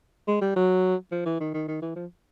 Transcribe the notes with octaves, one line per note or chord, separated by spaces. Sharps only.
G#3
G3
F#3
F3
E3
D#3
D#3
D#3
E3
F3